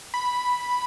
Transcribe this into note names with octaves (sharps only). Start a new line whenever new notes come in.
B5